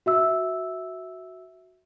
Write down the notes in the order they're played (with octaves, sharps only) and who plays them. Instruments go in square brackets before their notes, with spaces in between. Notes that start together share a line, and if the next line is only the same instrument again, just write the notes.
[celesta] F#4 E5 E6